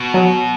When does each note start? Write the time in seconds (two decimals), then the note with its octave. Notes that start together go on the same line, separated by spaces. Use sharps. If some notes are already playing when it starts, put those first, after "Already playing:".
Already playing: B2
0.14 F#3